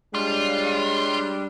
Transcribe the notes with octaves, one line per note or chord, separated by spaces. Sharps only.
G3 G#3 D4 F4 C#5